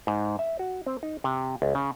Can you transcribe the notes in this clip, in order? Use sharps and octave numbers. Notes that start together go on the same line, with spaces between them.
G#2
E5
F#4
C4
D#4
C3
C#2
C#3